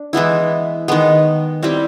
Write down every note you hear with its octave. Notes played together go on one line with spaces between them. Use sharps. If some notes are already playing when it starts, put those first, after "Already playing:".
Already playing: D4
E3 G#3 B3 E4
D#3 G#3 B3
G3 C4 E4